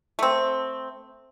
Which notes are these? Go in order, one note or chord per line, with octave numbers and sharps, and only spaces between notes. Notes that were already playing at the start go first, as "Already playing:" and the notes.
A3 C4